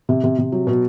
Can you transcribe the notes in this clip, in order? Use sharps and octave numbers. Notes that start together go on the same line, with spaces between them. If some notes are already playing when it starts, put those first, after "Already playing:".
C3
C3
C3
F#3
B2